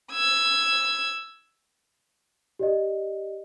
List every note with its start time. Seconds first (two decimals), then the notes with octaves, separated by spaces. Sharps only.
0.11 E6 G#6
2.59 G4 D5 D#5